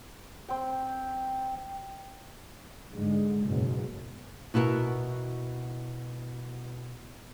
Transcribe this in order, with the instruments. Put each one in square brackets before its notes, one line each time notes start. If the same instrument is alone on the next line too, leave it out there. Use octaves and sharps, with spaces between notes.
[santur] C4 G5
[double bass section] G#2 D3 G#3
F#1 G#2 B2
[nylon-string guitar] B2 E4 F#4 A4 A#4